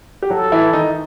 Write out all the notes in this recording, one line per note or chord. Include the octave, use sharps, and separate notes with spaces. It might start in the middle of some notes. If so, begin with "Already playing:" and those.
G4
F#3 F#4 A4
E3 E4
D#3 D#4